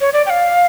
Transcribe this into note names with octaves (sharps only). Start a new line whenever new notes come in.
C#5
D5
G5
F5